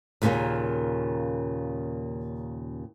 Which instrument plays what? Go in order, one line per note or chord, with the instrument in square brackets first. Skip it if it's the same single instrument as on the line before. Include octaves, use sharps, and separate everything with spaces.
[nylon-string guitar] D#2 A#2 C#3 A3 A#3 C#4